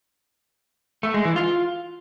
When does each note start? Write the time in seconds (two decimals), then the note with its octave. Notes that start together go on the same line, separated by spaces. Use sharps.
1.03 A3
1.14 G#3
1.25 E3
1.36 F4